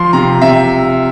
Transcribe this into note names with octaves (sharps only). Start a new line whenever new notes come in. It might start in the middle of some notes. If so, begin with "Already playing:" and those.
Already playing: F3 C6
C3 A#5
C3 E5